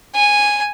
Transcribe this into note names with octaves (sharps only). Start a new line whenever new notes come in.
G#5